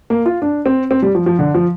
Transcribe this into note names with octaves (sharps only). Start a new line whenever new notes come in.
A#3
F4
D4
C4
C4
G3
F3
F3
D3
F3